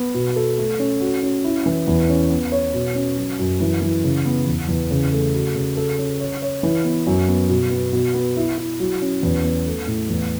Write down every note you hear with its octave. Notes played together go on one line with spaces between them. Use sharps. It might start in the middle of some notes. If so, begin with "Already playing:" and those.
Already playing: B3
B2
A4
A3
C#4
F#4
C#4
E4
E3
E2
C#4
B3
C#5
B2
C#4
F#3
F#2
E3
E3
C#3
B3
E2
E2
C#3
A3
F#4
C#3
A4
C#4
C#5
C#5
E3
B3
F#2
B3
B2
B3
B2
B3
E4
E4
F#3
C#4
E2
B3
A3
A2
E2